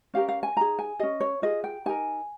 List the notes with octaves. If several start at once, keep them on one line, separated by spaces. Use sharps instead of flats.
C#4 G4 A#4 F5
F5
G#5
D#4 G#4 A#5
G#5
C#4 G#4 D#5
C#5
F4 G#4 D#5
G5
D#4 G4 A#4 G#5